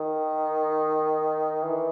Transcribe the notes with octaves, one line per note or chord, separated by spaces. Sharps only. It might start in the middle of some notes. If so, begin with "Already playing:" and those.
Already playing: D#3
E3